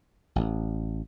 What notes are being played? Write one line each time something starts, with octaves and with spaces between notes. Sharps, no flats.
A1